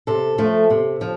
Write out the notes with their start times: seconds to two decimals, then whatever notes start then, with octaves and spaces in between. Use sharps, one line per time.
0.07 C3 A4
0.38 F3 A3
0.70 C3
1.01 F3